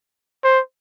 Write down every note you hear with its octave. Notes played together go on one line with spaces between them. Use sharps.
C5